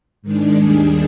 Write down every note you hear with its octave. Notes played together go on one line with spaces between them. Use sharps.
G#2 D#3 G#3 D4
D#2 D#3 G3 D4 G#4